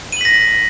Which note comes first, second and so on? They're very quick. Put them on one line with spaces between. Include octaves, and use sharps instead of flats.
D#7 F#7 B6 A#6